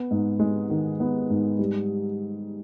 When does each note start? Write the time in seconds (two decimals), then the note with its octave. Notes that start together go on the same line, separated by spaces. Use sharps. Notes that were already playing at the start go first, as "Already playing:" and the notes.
Already playing: B3
0.11 G#2
0.39 G#3
0.70 D#3
1.00 B3
1.30 G#2
1.59 G3